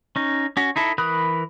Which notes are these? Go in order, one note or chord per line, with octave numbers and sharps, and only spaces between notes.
C#4 D#4
C#4 F#4
D#4 E4 A4
E3 A#4 B5 D#6 F#6